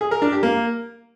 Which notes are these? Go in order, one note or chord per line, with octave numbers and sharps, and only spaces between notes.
G#4
A#4
D4
G4
A#3